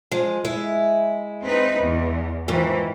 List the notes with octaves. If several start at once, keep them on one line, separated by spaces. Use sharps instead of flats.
F3 G#3
G#3 E4
C4 D#4 B4
E2
F2 G#2 D#3 E3